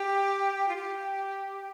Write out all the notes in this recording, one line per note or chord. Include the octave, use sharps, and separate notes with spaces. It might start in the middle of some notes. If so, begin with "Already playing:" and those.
Already playing: G4
F4
G4